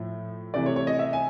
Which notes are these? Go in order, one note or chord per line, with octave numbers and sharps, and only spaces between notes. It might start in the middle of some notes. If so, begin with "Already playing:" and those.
Already playing: A2 F3 A3
C3 E3 A3 D5
C#5
C#5
D#5
E5
G#5